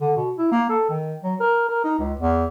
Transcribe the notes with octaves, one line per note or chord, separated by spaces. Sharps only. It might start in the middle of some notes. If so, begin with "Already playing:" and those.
D3
B2
E4
A#3
A4
D#3
F#3
A#4
A#4
D#4
C#2
E2